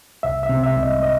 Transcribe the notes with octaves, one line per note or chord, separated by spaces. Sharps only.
C2 E5
E5
C3
E5
C2
D#5
D#5